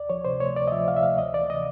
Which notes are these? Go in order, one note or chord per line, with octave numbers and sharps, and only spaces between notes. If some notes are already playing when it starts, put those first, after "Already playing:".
Already playing: D2 D5
F3 C#5
C3 C5
A3 C#5
D2 D5
D#5
F3 E5
C3 F5
E5
A3 F5
D2 D#5
E3 D5
C3 D#5